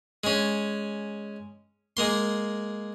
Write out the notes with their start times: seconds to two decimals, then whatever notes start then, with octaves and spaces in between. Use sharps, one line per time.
0.24 G#3 C#4
1.97 G#3 A#3 C6